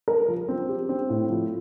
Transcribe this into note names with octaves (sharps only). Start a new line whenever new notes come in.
A#4
F3
C4
G4
C4
A2
F3